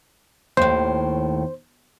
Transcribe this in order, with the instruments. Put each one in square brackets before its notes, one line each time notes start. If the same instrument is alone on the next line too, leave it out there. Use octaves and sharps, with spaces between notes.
[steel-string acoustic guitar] D#2 A2 [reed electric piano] C5